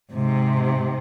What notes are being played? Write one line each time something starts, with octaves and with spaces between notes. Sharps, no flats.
G#2 C3